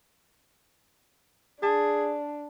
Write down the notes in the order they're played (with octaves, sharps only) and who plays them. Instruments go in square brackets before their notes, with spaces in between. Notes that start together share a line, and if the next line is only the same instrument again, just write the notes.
[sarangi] D4 [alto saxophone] G#4 [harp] A5